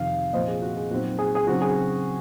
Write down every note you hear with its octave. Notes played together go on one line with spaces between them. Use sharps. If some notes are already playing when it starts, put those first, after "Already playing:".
Already playing: F2 C3 D#3 F5
A#2 F3 C4 C5 D#5
G#4
F#4
G#4
A#2 F#3 C4 D#4 F#4
G#4
G#4
C#3 F#3 C4 D#4 F#4
G#4